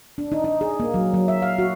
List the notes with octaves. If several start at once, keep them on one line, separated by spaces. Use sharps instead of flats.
D4
D#4
D#4
G#4
A#3
F#3
F#3
E5
F5
F#4